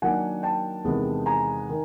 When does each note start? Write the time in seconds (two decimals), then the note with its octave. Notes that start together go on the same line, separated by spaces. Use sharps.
0.02 D#3 F#3 A#3 D4 F#5 G#5
0.43 G5 A5
0.84 E2 C3 D#3 G#3 B3
1.26 G#5 A#5
1.69 D#3